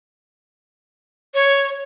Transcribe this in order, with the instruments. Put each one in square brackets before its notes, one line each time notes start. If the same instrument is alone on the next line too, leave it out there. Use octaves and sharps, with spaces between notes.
[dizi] C#5